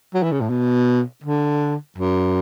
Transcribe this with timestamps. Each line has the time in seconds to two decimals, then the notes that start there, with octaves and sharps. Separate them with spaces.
0.14 F#3
0.23 E3
0.32 C#3
0.41 A2
0.50 B2
1.24 D3
1.98 F#2